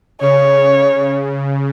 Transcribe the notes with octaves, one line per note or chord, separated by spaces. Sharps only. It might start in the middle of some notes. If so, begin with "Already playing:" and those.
C#3 C#5